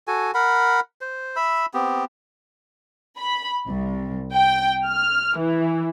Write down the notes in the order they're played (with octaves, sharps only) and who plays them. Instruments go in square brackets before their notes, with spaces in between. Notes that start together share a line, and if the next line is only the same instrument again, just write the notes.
[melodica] F#4 A4 G#5
A#4 F#5 B5
C5
E5 B5 E6
B3 C4 G4
[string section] B5
C2
G5
F6
E3